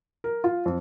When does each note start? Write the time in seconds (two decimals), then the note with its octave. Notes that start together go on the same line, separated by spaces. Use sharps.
0.24 A#4
0.44 F4
0.65 F2